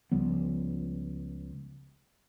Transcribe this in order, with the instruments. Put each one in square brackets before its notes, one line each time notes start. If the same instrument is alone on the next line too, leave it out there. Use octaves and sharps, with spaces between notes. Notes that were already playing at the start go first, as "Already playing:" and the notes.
[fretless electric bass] C#2 F3 G3 B3